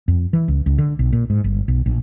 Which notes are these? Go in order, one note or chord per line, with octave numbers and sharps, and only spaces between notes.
F2
E3
C#2
C#2
D3
B1
A#2
G#2
G1
B1
A#1